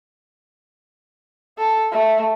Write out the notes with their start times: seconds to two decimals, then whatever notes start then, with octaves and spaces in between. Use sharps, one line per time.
1.58 A4
1.92 A3